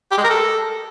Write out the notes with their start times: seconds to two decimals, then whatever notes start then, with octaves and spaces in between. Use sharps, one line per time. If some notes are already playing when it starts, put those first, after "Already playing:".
0.12 G4
0.18 G#3
0.24 A#4
0.30 A4